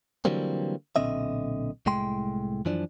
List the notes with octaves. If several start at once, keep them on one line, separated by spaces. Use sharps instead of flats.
D3 E3 F#3 G3 A#3 C4
B1 A#2 D3 C4 D#5 E5
C2 A2 G#3 G5 C6
F#2 E3 F3 D4